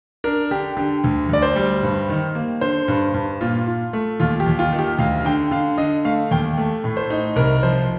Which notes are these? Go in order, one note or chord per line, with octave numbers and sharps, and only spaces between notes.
D4 A#4
D3 G4
D3 G4
D2
D2 D5
C5
G3
G2
D#3
A#3
D3 C5
G2
G2
A#2 F4
F4
A3
D#2 F4
G4
D#2
F4
D#3
G4
D2 F5
D3 G5
D3 F5
D3 D#5
A3 F5
D#2 G5
A3
A2
C5
D#4
C2 A#4
F3 C5